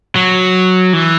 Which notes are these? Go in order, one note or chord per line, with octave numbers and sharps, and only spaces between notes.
F#3
E3